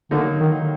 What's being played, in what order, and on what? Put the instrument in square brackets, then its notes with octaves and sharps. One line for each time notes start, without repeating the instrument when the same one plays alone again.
[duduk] D3 [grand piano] F#3 A#3 D#4
[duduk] D#3